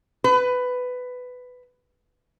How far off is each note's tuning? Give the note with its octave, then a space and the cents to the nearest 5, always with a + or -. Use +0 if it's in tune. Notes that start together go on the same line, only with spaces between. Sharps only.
B4 +15